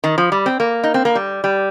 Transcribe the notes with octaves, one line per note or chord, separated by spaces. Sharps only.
D#3
F3
G3
C4
A#3
D#4
C4
A#3
G3
G3